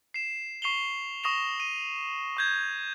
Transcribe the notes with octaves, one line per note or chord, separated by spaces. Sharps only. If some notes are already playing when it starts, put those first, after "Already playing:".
C7 E7
C#6 C7 E7 F7 G7
C#6 D#6 A#6 E7 F7
D#7
C#6 G6 G#6